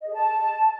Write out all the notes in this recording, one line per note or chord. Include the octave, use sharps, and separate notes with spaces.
D#5
G#4
A5